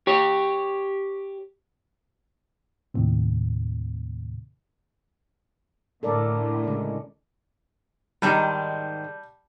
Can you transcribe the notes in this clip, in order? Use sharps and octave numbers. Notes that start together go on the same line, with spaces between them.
G4 C#5
D#2 A2 C3
A2 D3 A4 A#4 D5
C#3 G#3
G#2 D#3 G3 G#3 D5 A5 G6